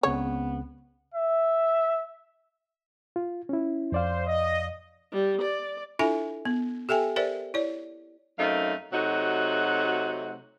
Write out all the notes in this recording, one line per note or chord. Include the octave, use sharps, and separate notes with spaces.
C#2 C#3 B3 C4 C#5
E5
F4
C#4 E4
F2 C5 D5 F5
D#5
G3
D5
D4 E4 F4 A4 E5 G#5
B3
G4 A4 E5 G5 G#5
G4 A#4 C5 D5 E5
E4 C#5 D5
F#2 A3 C4 D#4 F5
C3 F#3 A3 D#4 F#4